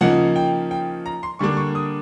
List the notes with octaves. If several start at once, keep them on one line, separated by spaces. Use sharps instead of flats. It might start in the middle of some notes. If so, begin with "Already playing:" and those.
C#3 F3 A#3 D#4 F#5
G5
G5
A#5
C6
D3 G3 A#3 D4 C#6
C#6
D#6